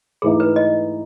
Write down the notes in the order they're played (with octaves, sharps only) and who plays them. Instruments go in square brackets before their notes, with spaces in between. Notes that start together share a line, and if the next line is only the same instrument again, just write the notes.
[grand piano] G#2 E3 A3 D#4 [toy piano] G#4
[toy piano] B4
D#5